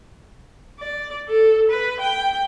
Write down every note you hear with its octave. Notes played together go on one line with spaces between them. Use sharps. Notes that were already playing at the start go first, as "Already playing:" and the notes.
D5
A4
B4
G5